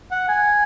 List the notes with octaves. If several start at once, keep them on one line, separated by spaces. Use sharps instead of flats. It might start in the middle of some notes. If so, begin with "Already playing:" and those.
F#5
G#5